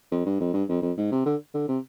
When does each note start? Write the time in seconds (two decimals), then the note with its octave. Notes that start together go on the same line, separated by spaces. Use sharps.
0.11 F2
0.26 G2
0.40 F2
0.54 G2
0.69 F2
0.82 F2
0.97 G#2
1.11 C3
1.26 D3
1.54 D3
1.69 C3